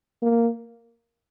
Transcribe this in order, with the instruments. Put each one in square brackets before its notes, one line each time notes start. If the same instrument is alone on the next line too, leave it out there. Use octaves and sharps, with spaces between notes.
[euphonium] A#3